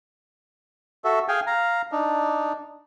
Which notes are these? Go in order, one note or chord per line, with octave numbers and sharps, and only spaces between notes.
F#4 A4 E5
G#4 F5 G5 G#5
F5 A#5
D4 D#4